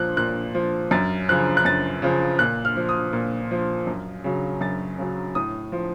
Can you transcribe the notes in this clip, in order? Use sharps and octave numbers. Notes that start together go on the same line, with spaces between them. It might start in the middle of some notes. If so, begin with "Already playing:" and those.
Already playing: A#2 F3 F#6
A#2 F#6
F3
F#2 A6
C#3 F3 F#6
F#6
F#2 A6
C#3 F3
A#2 F#6
F6
F3
D#6
A#2
F3
F#2
C#3 F#3
F#2 A6
C#3 F#3
A2 D#6
F3